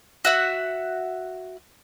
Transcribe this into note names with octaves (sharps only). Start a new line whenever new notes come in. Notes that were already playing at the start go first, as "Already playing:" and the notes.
F#4 E5 F#5